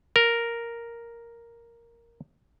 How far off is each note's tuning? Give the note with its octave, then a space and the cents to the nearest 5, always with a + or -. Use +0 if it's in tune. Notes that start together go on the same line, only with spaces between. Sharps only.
A#4 +0